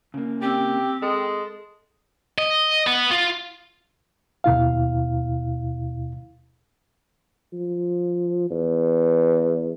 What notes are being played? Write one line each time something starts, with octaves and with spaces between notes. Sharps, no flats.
C#3 A#3
C4 G4
G#3 A4
D#5
B3
F4
D#2 B2 E4 F5
F3
E2